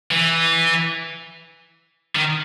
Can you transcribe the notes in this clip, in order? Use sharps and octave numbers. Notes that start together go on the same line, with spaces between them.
E3
D#3